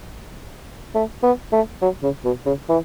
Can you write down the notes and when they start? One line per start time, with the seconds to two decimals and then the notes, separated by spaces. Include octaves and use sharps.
0.95 A3
1.23 B3
1.52 A3
1.82 F#3
2.03 C#3
2.25 B2
2.46 C#3
2.69 E3